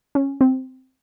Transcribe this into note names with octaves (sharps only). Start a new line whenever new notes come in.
C#4
C4